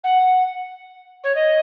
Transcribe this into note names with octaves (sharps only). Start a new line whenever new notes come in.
F#5
C#5
D#5